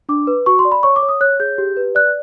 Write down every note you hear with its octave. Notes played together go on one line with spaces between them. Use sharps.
D4 D6
B4
F#4 C#6
C6
D5
B5
C#5 C#6
D6
C#5
D#6
C#5 F#6
G#4 G6
G4
B4
D5 F#6